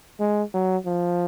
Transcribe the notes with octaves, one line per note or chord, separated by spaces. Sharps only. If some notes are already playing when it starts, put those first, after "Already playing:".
G#3
F#3
F3